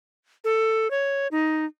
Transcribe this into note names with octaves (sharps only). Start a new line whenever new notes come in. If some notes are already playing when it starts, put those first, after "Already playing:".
A4
C#5
D#4